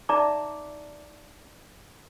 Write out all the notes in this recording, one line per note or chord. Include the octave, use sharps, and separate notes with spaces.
D#4 D5 E5 A5 A#5 D6